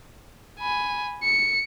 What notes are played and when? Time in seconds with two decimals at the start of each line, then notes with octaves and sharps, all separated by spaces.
0.60 G#5 B5
1.23 C#7